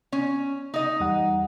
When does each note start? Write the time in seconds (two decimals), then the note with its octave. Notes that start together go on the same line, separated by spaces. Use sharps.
0.12 C#4
0.74 D#4 D#5
1.00 E2 G3 F#5